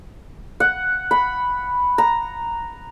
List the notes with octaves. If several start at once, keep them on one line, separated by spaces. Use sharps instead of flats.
F#5
B5
A#5